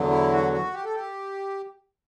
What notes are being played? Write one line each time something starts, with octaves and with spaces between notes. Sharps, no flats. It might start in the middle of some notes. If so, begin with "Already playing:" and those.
Already playing: E2 D3 F#3
E4
F#4
F#4
G4
A4
G4